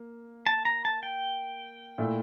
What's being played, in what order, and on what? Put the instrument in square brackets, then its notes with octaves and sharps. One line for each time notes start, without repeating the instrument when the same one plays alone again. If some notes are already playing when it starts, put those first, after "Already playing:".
Already playing: [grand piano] A#3
[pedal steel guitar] A5
A#5
A5
G5
[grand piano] A#2 A3 E4